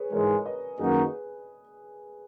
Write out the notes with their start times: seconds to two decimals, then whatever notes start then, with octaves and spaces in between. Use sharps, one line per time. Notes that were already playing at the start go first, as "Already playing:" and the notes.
Already playing: G#4 B4 C#5
0.12 G#2 E3 G#3 A#4 C#5
0.45 B4 D#5
0.79 F#2 D#3 A#3 D#4 F#4 G#4 B4